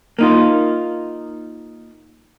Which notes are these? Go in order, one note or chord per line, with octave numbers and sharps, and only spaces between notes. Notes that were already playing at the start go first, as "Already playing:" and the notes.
A#3 D#4 F4